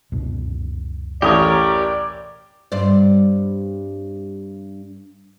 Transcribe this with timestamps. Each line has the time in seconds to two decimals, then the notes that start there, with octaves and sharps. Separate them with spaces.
0.12 C#2 F#2 B2
1.22 A1 G4 A#4 C#5 D5 D#6
2.72 G2 C4 D5